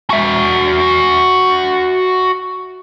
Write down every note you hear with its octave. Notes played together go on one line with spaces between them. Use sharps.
F#4 E5